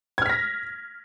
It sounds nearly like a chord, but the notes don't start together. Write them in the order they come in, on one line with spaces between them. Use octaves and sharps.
G#6 F6 B6 A#6